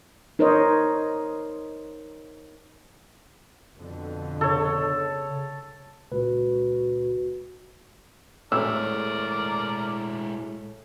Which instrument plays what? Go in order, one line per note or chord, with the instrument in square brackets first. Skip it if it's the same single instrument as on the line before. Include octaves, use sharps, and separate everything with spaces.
[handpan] D#4 A#4 C5 C#5 D#5
[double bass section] F2 B2 D3
[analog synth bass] C#3 [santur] A4 C#5
[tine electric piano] C#2 A#2 B4 [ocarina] F#4
[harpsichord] A2 [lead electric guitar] G#3 E4 [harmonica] A#4 D5 [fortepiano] E6